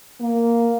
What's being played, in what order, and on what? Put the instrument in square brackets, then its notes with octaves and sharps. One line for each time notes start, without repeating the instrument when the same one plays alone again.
[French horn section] A#3